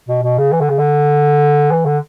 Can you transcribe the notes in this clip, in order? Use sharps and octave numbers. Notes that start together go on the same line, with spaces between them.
B2
B2
C#3
E3
D3
C#3
D3
E3
D3